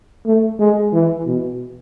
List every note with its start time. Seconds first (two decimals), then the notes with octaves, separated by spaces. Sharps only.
0.26 A3
0.59 G#3
0.93 E3
1.26 B2